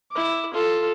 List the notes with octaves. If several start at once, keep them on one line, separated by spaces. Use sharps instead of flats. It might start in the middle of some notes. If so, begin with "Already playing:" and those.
E4 D6
F4 A4